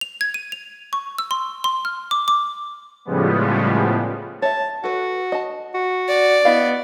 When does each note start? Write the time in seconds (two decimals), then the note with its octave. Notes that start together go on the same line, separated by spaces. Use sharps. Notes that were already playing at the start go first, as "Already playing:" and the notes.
0.01 F7
0.21 G#6
0.34 D#7
0.52 F7
0.93 C#6
1.18 E6
1.31 C6
1.64 C6
1.85 F6
2.11 D6
2.28 D6
3.05 A2 C#3 F3 G3 G#3 B3
4.42 C#5 E5 A5
4.84 F#4 A4 B4
5.32 D#5 A5
5.74 F#4
6.08 D5
6.45 B3 E4 D#5 F5